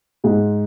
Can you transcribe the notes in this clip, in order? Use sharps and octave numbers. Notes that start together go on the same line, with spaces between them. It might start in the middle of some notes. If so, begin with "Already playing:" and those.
G#2 G#3